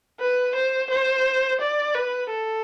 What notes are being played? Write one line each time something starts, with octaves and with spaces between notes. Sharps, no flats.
B4
C5
C5
D5
B4
A4